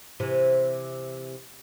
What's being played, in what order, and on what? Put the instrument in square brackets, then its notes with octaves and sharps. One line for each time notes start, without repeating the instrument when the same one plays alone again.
[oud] C3 E3